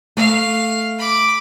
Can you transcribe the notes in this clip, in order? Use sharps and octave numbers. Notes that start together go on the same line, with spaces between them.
A3 F5
B5 D6